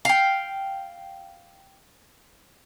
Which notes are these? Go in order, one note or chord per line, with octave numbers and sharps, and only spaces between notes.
F5 G5